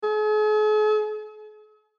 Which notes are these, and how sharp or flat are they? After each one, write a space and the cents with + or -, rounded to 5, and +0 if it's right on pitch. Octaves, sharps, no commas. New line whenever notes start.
G#4 +45